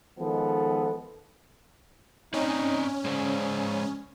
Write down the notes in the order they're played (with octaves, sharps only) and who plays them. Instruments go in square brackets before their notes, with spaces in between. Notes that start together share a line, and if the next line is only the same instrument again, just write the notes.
[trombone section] D#3 F3 G#3 B3 A4
[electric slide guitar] C4 D5 D#5 [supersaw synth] C#4 [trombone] D#4
[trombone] C#3 [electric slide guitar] G#3 C5 D5